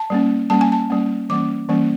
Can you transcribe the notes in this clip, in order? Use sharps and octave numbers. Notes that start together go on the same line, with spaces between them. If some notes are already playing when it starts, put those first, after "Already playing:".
Already playing: A5
G3 A#3 C#4
G3 A#3 C#4 A5
G#5
A5
G3 A#3 C#4
E3 G3 A#3 C#4 D6
E3 G3 A#3 C#4